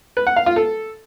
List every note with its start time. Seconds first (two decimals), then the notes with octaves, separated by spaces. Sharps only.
0.17 B4
0.27 F#5
0.36 F5
0.46 F4
0.56 A4